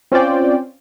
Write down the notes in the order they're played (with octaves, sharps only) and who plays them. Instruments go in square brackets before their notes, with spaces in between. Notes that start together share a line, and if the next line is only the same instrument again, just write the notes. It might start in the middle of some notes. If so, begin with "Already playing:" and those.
[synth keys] C4 C#4 F4 C5 D5 G5